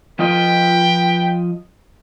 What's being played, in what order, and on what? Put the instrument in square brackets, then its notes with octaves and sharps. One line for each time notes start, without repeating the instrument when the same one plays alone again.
[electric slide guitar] F3 F4 D#5 [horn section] B4 G5